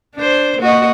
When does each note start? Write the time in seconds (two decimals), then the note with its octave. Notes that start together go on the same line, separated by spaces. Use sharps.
0.16 D4 C5
0.59 A#3 F#4 D#5